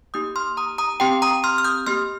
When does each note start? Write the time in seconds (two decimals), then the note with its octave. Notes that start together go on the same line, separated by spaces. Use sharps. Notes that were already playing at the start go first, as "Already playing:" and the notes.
0.14 A#3 D#4 G4 D#6 G6
0.36 C6 F6
0.57 A#5 D#6
0.78 A#5 D#6
1.00 C4 G4 G5 C6
1.22 A#5 D#6
1.44 C6 F6
1.58 F6
1.65 D#6 G6
1.86 A#3 G4 C6 F6